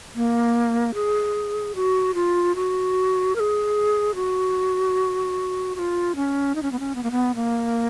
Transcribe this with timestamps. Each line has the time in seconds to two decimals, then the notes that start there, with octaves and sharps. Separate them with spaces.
0.15 A#3
0.94 G#4
1.75 F#4
2.14 F4
2.56 F#4
3.36 A#4
3.40 G#4
4.15 F#4
5.75 F#4
5.79 F4
6.16 C#4
6.55 D#4
6.63 C#4
6.72 B3
6.79 C#4
6.95 B3
7.03 A#3
7.11 B3
7.35 A#3